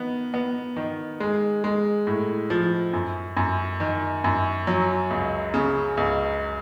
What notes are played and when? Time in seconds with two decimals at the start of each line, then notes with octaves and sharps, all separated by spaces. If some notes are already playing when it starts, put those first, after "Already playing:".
Already playing: D#3 B3
0.34 B3
0.76 D#3
1.20 G#3
1.64 G#3
2.07 A2
2.50 F3
2.93 F#2
3.37 F#2
3.80 D#3
4.24 F#2
4.67 F#3
5.10 C#2
5.54 C#3
5.97 C#2